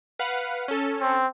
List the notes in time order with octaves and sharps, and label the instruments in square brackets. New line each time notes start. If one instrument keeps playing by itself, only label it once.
[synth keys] B4 F5 F#5
C#4 A4
[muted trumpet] C4